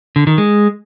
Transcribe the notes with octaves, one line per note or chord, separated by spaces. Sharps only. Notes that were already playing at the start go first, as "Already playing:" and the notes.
D3
D#3
G#3